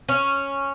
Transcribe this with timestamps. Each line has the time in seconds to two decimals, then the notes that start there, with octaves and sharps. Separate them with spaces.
0.09 C#4